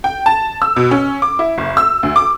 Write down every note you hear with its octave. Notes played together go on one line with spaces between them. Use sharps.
G5
A5
E6
B2
C#4
D6
E4
F#1
E6
D2
D6